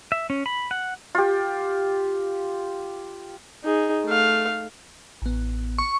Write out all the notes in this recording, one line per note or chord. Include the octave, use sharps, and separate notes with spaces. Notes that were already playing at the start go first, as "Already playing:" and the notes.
E5
C#4
B5
F#5
F4 G4
D#4 G#4
A3 F5
A1 B3
C#6